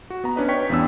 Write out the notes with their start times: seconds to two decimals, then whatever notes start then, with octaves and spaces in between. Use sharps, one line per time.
0.10 F#4
0.24 B3 A#5
0.36 C#4 D4 B4 D#5
0.48 C#5 G5 C#6 B6
0.70 E2 G2 B3 D4 E6